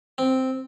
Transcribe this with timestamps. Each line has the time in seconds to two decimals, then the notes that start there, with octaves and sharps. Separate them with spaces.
0.18 C4